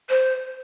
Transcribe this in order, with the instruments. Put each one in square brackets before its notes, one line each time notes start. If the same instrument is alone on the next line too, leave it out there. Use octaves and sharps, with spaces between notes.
[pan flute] C5